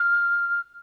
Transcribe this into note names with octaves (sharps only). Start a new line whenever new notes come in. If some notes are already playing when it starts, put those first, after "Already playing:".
Already playing: F6